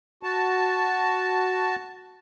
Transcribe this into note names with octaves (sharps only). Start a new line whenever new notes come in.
F#4 A5